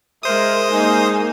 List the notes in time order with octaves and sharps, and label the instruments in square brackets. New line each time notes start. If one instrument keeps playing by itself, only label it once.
[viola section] G#3 A#4 [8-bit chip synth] C5 D#6 [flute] E5
[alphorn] G#3 [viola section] A#3 D#4 [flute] G#5